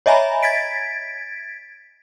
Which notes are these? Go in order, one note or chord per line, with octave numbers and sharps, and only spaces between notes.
C#5 D#5 E5 G#5 A#5 B5
G#6 A6 B6 D7